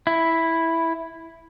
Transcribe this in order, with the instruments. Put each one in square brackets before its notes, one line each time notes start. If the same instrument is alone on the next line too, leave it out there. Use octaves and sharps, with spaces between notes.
[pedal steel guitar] E4